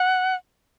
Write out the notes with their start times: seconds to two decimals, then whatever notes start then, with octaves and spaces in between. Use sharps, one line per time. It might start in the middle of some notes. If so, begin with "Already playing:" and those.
Already playing: F#5